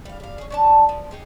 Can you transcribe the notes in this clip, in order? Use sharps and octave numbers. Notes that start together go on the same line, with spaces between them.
G3 F5
G3 F5
C#4 G#4
C#4 D4 A5
F3
D#4 G4 G#4